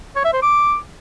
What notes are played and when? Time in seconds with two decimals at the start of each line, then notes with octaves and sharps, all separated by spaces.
0.16 C#5
0.24 E5
0.33 C5
0.42 D6